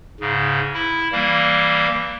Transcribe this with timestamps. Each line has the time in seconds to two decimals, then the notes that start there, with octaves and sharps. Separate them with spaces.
0.20 G#2 C#3
0.74 E4
1.12 E3 G3 A#3